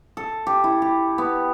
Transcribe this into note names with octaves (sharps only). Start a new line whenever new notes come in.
A4
G4
E4
G4
B3